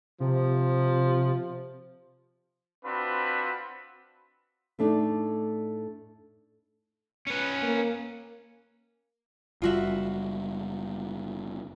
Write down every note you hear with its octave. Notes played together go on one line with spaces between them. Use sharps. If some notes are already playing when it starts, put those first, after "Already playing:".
C3 F3
C4 D4 F4 F#4 B4 B5
A2 A3 D4 D#4
C#4 B4
A#3
F#1 G3 F4 F#4 E5